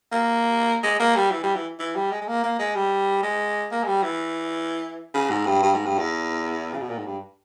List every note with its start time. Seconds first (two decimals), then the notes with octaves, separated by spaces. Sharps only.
0.12 A#3
0.83 G#3
1.00 A#3
1.16 G3
1.31 E3
1.43 G3
1.56 E3
1.79 E3
1.96 G3
2.11 G#3
2.21 G#3
2.28 A#3
2.43 A#3
2.59 G#3
2.75 G3
3.23 G#3
3.71 A#3
3.83 G#3
3.87 G3
4.03 E3
5.14 C#3
5.30 G#2
5.46 G2
5.63 G2
5.75 G#2
5.86 G2
5.99 E2
6.74 C#3
6.81 B2
6.90 A#2
6.97 G#2
7.06 G2